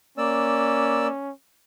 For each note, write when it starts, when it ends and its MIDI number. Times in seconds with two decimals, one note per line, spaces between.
0.18 1.07 58
0.18 1.31 61
0.18 1.07 74
0.18 1.07 88